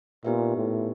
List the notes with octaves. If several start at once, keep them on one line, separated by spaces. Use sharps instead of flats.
A#2 B3 D#4 G4 B4 E5
A2